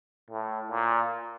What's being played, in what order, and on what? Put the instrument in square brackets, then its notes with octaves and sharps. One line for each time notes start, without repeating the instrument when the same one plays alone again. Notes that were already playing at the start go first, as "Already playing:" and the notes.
[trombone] A2
A#2